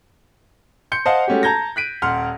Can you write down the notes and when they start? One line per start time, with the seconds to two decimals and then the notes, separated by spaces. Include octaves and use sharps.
0.92 C6 G6 C#7
1.06 C5 D#5 F5 F#5 A5
1.28 G#3 A3 C#4 F#4 G4
1.43 A5 A#5 G6 G#6 A#6
1.76 F#6 B6 D7 D#7
2.02 D#1 F#5 C6 F6